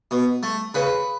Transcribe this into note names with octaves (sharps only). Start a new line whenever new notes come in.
B2
A3
C#3 B4